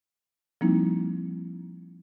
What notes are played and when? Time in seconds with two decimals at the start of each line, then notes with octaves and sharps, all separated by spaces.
0.61 F3 G3 A#3 C4 D#4 E4